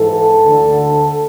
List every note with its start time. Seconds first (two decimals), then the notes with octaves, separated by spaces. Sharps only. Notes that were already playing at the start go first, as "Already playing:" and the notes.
Already playing: G#2 E3 A4
0.43 D2 D3